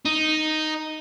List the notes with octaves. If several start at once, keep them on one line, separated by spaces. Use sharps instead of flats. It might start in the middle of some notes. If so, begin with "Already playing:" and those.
D#4